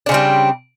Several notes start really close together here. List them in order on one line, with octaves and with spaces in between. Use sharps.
D4 C#3 C4 G3